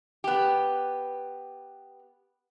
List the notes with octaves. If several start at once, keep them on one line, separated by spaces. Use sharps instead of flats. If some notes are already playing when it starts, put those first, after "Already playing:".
B3 G4